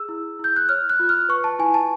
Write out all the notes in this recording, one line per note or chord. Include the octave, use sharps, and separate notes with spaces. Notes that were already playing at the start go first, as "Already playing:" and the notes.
Already playing: G#4 E6
E4
E4 G6
F#6
C#5 F6
F#6
F4
F6
B4 C#6
A5
E4 G#5
A5